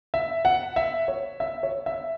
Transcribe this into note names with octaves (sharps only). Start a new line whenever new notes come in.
E5
F#5
E5
C#5
E5
C#5
E5